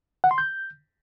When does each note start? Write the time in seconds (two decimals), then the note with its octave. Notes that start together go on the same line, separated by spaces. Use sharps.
0.24 F#5
0.31 C6
0.38 G6